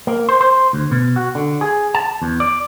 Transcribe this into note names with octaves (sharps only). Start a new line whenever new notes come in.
A#3
C5
C5
D2
B2
F#4
D3
G#4
A5
E2
D5